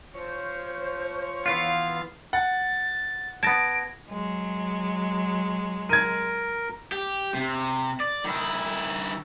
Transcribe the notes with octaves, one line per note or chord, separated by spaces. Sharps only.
F3 C5 C#5
E3 B3 F4 F5
F#5 A6
B3 A5 G#6 A#6 D7
F#3 G#3
A#4 G#6 D#7
G4
C3
D5
D#3 E4